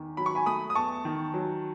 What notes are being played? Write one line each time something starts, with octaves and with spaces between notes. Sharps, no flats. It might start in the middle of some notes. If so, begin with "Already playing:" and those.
Already playing: E2 D#3
F#3 B5
C#6
G#5 B5
A3 B5 D#6
D#6
E2 A5 C#6
D#3
F#3